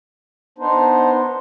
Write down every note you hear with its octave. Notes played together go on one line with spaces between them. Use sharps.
B3 D4 D#4 C5